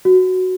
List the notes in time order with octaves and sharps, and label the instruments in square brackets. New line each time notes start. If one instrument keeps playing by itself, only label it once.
[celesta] F#4